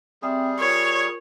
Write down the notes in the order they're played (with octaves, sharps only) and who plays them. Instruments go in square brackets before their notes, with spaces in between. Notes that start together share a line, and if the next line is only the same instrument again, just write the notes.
[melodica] G3 G#4 [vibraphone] C4 E5 G5
[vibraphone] F4 A#4 [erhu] C#5